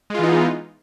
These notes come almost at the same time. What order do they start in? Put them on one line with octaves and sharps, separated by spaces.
G#3 F4 E3 D#4 B3